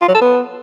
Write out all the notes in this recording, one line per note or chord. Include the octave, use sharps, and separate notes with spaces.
F4
F#3
A4
B3